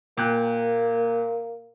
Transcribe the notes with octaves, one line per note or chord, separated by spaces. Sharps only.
A#2 A#3 G5 F#6